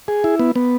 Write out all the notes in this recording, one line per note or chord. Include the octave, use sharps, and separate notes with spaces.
G#4
E4
B3
B3